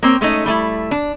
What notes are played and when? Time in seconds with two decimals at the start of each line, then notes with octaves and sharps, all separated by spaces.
0.03 A#3 C4 C#5
0.21 G#3 A3 C#4 D#4
0.46 G3 A3 E4
0.91 D4